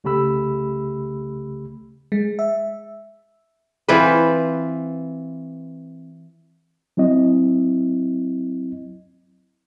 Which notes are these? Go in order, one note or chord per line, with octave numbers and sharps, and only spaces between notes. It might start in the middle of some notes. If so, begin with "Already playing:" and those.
C2 C#3 A3 G4 B5 E6
G#3
E5
E3 C4 F4 B4
F#3 C4 E4 D#5